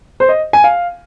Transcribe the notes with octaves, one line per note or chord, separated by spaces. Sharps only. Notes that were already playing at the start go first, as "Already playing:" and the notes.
C5
D#5
G#5
F5